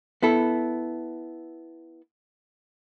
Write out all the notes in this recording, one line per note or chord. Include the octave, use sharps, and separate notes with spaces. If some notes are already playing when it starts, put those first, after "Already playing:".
B3 E4 A4